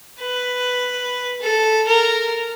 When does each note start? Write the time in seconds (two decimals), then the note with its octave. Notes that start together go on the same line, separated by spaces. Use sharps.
0.20 B4
1.42 A4
1.88 A#4